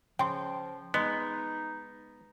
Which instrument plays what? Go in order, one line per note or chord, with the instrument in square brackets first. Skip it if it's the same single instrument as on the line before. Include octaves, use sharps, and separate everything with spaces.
[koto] C#3 [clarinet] F3 [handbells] G5 C6
[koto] G#3 [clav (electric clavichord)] B3 [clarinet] D#4